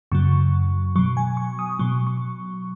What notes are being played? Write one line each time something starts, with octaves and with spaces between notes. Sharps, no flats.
F#2 C#3 F#3 C#6
B2 F#3 C#6
G#5
C#6
D#6
B2 F#3 C#6
C#6